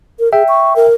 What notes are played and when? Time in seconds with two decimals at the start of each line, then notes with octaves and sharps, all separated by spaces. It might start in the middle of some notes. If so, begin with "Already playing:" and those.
0.19 A#4
0.33 G#4 E5 G5
0.48 C#6
0.76 A#4